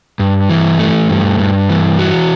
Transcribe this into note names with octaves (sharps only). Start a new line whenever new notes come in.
G2
E3
A3
G2
G2
E3
F#4